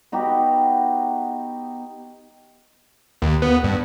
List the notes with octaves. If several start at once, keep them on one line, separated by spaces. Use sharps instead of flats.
B3 D#4 F#4 G4
D#2
B3
G2